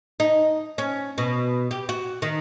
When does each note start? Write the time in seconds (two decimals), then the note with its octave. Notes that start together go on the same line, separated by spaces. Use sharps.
0.20 D#4
0.78 C#4
1.18 B2
1.71 G4
1.89 F#4
2.22 D#3